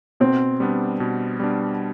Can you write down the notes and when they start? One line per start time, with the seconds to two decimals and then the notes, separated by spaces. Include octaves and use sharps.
0.20 B2 C4
0.60 G3 B3 D4
1.00 B2
1.40 G3 B3 D4